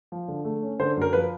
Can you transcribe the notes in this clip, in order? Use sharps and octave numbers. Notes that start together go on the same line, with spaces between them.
F3
D3
A3
C#4
D3 C5
F#2 A#4
F3 B4